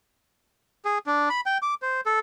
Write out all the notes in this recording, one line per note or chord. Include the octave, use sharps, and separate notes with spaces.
G#4
D4
B5
G5
D6
C5
A4